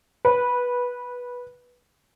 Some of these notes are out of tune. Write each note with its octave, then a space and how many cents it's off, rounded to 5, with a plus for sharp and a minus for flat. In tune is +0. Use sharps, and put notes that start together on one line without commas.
B4 -5